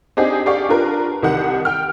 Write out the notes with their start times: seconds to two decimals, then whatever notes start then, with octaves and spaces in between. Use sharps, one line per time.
0.17 C4 D4 D#4 G4 G#4
0.46 G4 G#4 D5 F5 G5 C#6
0.69 D4 F4 A#4 B4
1.22 C2 D#3 G4 F#5
1.65 G5 F6